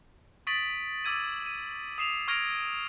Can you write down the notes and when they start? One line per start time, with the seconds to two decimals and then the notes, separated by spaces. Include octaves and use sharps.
0.47 C#6 D#6 A6 B6 D7 F#7
1.05 D6 E6 G#6 D#7
1.46 D#7
1.98 D#6 C7 E7 F7
2.28 C#6 F6 G#6 A#6 D7 F7